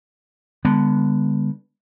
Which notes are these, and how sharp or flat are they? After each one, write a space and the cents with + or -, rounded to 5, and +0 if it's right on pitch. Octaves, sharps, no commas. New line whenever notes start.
D3 +0 G#3 -45 B3 -10